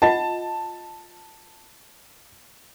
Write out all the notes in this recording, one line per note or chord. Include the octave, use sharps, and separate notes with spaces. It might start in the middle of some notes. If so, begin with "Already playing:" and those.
F4 D#5 F#5 A5